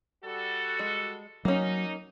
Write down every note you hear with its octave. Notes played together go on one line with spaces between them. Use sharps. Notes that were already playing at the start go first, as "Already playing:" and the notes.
G3 F#4 A4
G#3
F#3 A#3 C#4 D#4